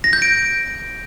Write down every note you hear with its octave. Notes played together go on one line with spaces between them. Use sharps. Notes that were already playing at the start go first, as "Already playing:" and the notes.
A#6
G6
D7